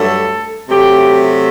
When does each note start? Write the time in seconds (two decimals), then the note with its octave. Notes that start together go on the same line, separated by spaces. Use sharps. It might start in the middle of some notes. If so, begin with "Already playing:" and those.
Already playing: G2 F#3 A3 A4
0.69 C3 F#3 A3 G4